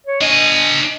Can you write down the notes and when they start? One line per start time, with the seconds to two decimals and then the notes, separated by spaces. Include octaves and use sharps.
0.07 C#5
0.21 D4 D#5 G#5